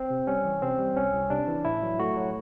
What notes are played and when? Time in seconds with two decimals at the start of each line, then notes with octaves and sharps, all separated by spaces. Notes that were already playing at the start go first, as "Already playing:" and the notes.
Already playing: C4
0.10 C3
0.27 G3 C#4
0.45 E3
0.62 C3 C4
0.79 G3
0.97 C2 C#4
1.14 C2
1.30 C3 D4
1.48 E3
1.65 A2 E4
1.83 F#3
1.99 A3 F#4
2.16 F#3